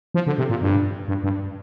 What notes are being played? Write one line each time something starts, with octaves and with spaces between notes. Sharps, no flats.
F3
D3
C3
A#2
G2
G2
G2